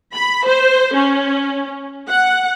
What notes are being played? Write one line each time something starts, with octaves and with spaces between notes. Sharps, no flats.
B5
C5
C#4
F#5